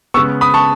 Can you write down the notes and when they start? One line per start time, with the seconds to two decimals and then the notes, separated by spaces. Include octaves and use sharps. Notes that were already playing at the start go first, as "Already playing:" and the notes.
0.14 C#3 G#3 B3 C#6 E6
0.41 B5 D#6
0.54 A5 C#6